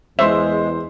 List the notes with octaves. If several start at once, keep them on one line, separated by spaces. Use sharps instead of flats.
E2 G#3 C5 E5 C6